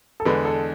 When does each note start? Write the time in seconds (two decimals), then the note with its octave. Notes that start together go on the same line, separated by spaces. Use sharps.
0.20 A4
0.25 E2 D3 G#3 B4
0.45 A4